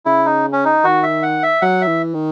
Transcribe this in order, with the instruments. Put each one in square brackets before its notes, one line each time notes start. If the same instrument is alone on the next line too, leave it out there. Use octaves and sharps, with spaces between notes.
[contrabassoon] C#3 [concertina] E4
[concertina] D#4
C#4
D#4
[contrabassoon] D#3 [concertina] F#4
[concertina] E5
F#5
E5
[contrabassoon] F#3 [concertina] F#5
[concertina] E5
[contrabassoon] E3
D#3